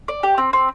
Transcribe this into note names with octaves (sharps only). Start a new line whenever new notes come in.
D5
G4
C4
C4